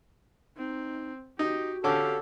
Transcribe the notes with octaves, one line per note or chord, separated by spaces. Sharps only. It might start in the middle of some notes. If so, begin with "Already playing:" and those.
C4 D#4
D#4 F#4 G4
D3 C#4 G4 A4 F5 D6